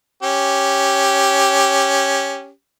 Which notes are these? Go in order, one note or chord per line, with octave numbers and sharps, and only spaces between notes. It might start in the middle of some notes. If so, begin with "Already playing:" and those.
C#4 G4